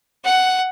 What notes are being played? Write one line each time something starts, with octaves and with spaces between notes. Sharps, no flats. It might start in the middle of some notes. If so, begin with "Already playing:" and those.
F#5